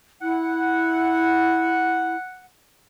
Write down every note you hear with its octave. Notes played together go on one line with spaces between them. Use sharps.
E4 F#5